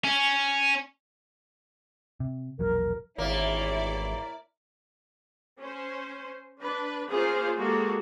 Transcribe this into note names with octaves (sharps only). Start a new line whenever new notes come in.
C#4
C3
E1 A#1 F#3 A#4
G#1 E2 G2 A#3 E4 C#5 D5
C#4 C5
D4 B4
A#3 C#4 F4 G#4 C5 F5
G#3 A#3 F#4 G4 A4